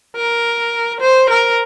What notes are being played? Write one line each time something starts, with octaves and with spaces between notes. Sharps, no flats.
A#4
C5
A#4